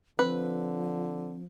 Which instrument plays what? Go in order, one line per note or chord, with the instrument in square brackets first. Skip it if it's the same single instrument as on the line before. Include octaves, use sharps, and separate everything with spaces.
[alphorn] D3 [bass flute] F3 [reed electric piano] C4 [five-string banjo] B4